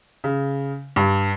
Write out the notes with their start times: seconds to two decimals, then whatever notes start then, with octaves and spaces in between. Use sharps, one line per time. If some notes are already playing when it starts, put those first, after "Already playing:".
0.24 C#3
0.96 G2